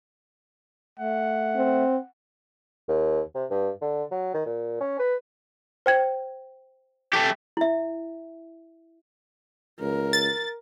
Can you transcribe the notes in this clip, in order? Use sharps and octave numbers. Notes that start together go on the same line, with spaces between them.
A3 F#5
C4
D#2
C3
G2
D3
F#3
D#3
A#2
C#4
B4
C5 G5 G#6
A3 G4
E4 E5
C#2 A#4
A6